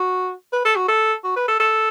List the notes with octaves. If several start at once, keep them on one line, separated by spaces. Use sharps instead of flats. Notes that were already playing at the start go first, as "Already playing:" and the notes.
Already playing: F#4
B4
A4
F#4
A4
F#4
B4
A4
A4